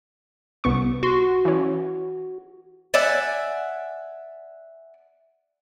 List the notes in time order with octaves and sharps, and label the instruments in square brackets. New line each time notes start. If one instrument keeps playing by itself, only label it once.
[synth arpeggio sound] C2 B3 C#6
[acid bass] F#4 [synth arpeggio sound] C6
[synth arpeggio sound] E3 C#4
[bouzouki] D5 E5 F#5 G#5